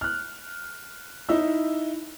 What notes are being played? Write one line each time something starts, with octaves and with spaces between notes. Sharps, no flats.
F6 F#6
D#4 E4 E6